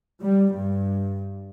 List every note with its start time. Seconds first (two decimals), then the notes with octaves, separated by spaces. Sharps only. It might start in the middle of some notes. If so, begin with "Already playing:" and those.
0.22 G3
0.56 G2